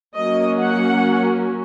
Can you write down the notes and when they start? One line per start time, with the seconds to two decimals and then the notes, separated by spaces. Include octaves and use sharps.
0.15 F#3 A#3 C#4 D#5
0.58 F#5